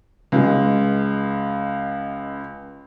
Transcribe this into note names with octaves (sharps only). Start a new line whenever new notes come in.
C#2 G#3